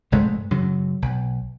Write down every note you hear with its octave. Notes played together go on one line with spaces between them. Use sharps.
F1 G2 G#3 A3
F#2 C#3 F#3
B1